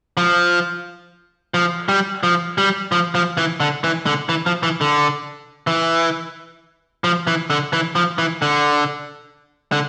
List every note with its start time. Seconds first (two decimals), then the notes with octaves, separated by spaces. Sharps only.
0.17 F3
1.54 F3
1.89 G3
2.23 F3
2.58 G3
2.92 F3
3.15 F3
3.37 E3
3.60 D3
3.84 E3
4.06 D3
4.29 E3
4.46 F3
4.63 E3
4.81 D3
5.67 E3
7.04 F3
7.27 E3
7.50 D3
7.73 E3
7.95 F3
8.18 E3
8.42 D3
9.72 D3